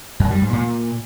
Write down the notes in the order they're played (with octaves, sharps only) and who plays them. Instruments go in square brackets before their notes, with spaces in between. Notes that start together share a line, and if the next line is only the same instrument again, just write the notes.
[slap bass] F#2
G3
G#2
A#2